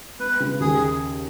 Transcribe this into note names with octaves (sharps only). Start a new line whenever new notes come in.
B3 B4
C#3
D#2 G#4